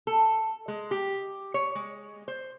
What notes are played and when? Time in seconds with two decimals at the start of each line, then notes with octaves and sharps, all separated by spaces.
0.07 A4
0.68 G#3
0.91 G4
1.54 C#5
1.75 G#3
2.28 C5